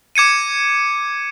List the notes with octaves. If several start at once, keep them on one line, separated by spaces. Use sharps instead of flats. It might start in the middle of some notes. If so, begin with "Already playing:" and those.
D6 G#6 C#7 D#7